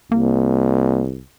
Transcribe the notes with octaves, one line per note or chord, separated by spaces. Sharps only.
C2 A#3